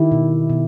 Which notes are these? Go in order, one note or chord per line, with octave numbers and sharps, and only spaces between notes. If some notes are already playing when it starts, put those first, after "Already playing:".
Already playing: D#3 E4 G4
B2
B2